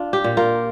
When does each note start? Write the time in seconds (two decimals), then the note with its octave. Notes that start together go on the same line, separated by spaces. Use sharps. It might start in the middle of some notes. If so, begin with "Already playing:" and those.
Already playing: D4 F4
0.13 G4
0.24 A#2
0.37 F4 A#4